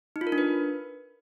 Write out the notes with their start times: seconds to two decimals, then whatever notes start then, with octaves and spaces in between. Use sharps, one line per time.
0.16 D#4
0.21 F4
0.27 A#4
0.32 D4
0.38 B4